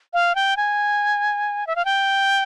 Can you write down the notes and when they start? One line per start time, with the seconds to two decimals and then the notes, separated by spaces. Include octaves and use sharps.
0.14 F5
0.35 G5
0.57 G#5
1.67 E5
1.76 F5
1.85 G5